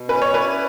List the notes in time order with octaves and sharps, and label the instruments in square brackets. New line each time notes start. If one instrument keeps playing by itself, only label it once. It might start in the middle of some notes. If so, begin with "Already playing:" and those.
Already playing: [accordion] B2
[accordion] C#4 [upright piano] B4
[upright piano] C#5
[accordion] E4 [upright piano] B4 D5